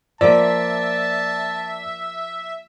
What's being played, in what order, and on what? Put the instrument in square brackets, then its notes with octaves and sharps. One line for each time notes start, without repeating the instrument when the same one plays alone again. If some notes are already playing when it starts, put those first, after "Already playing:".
[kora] F3 A#3 [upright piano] D5 [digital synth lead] E5 [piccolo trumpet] A5